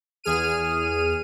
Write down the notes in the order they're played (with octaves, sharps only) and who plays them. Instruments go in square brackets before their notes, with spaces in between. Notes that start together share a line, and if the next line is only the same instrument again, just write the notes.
[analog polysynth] E2 G#4 F6 D#7